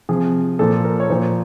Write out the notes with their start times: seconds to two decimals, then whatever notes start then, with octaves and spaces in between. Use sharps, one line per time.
0.09 C3 F3 G#4
0.59 A#2 F3 A4
0.85 A#4
1.00 C#5
1.10 A#2 F3 C5